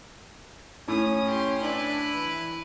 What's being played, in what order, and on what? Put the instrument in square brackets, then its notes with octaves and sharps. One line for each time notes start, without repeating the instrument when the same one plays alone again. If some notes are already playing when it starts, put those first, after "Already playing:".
[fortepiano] A2 [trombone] C#4 [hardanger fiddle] D#6
[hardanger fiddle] G4 C6
[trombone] D4 [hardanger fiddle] E4 B4
[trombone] E3